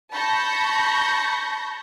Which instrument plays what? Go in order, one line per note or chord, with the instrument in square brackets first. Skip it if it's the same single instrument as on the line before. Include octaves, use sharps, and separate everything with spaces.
[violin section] A5 B5 C#6 G6 A#6